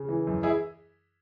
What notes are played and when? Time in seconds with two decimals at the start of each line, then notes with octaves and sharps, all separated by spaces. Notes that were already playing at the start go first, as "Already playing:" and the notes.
Already playing: C#3
0.09 E3
0.27 F#2
0.43 E4 G#4